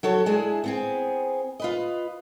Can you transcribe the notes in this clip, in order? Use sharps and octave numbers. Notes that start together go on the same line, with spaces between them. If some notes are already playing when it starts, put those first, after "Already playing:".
F#3 F#4 A4 C#5
G#3 D4 E4 G#4
B3 C4 G#4
F4 B4 D#5